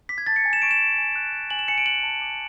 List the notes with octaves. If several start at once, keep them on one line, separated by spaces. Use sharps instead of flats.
D6 B6
G#6
A5 A6
C#7
G#5
E7
C#6 D7
E7
G#5
G#5
F#6
F#6
G#5 F#7
E7
G#5 C#7
D7
F#6 F#7
A5
D6